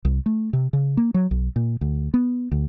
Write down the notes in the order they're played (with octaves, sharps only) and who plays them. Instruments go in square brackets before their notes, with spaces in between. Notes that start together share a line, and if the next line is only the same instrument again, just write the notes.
[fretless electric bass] C2
A3
C3
C#3
A#3
F#3
B1
A#2
D2
B3
D2